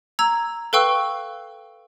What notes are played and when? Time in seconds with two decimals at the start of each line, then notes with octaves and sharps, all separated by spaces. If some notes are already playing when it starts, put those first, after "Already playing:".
0.19 A#5 E6 G#6
0.73 A4 B4 F5 G5 C#6 E6